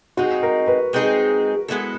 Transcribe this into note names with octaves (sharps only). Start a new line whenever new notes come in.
G#3 C4 D#4 F#4 G#4
A#4
B4
G#3 C4 D#4 G#4
G#3 B3 E4 A4